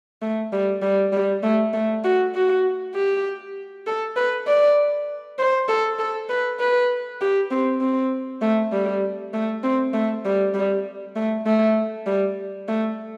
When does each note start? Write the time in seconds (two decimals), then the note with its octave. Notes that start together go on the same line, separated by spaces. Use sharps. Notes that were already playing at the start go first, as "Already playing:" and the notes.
0.22 A3
0.52 G3
0.82 G3
1.12 G3
1.43 A3
1.73 A3
2.04 F#4
2.35 F#4
2.95 G4
3.87 A4
4.16 B4
4.47 D5
5.39 C5
5.68 A4
5.99 A4
6.29 B4
6.60 B4
7.21 G4
7.51 C4
7.81 C4
8.42 A3
8.72 G3
9.34 A3
9.63 C4
9.93 A3
10.25 G3
10.54 G3
11.16 A3
11.46 A3
12.06 G3
12.68 A3